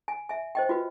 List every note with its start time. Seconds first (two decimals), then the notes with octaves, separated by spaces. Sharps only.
0.08 G#5
0.29 E5 G#5
0.55 C5 D#5 G5
0.69 F4 F#4 B4